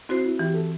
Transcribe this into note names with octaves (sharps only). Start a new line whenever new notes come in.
C4 E4 F#4 C5
E4
E3 G4
A4